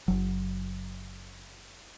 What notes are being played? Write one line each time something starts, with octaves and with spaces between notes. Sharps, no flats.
F#1 F#3